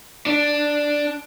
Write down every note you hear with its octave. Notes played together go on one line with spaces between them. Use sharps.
D4